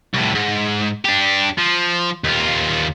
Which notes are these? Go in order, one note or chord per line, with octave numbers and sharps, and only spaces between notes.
C2 A2
G#2
D4 G4
F3
D#2 F4